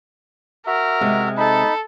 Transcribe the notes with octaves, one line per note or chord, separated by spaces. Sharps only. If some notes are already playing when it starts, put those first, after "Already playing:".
F#4 A#4 E5
C3 G#3
D#4 A4 B5